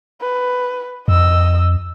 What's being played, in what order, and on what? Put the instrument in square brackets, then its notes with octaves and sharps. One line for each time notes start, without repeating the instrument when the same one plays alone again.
[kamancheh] B4
[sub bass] F2 [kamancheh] D#5 E6